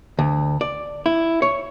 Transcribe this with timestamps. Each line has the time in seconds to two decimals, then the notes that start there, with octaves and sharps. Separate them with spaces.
0.19 D2
0.61 D5
1.06 E4
1.42 C#5